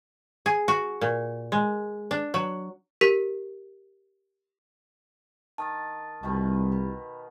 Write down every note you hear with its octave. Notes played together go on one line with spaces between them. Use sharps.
G#4
F#4
A#2
G#3
D4
F#3
G4 A#4 B6
D#3 A5 D#6 A6
C2 B2 D#3 B3
B5